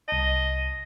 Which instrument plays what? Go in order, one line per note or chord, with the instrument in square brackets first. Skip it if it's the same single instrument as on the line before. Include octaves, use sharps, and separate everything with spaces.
[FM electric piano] C2 A5 [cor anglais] D#5